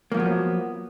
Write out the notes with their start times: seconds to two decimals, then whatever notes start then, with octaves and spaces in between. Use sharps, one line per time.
0.12 A#3
0.14 F3
0.17 B3
0.20 F#3